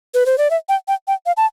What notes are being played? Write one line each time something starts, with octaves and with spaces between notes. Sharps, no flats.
B4
C5
D5
E5
G5
G5
G5
F5
A5